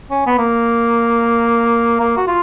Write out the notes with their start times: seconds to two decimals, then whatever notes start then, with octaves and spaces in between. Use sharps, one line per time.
0.11 C#4
0.26 B3
0.38 A#3
2.00 A#3
2.17 F#4
2.27 F4